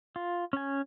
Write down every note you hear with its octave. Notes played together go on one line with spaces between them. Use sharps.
F4
C#4 G#5